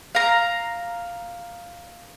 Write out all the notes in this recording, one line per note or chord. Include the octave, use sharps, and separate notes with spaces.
F5 A#5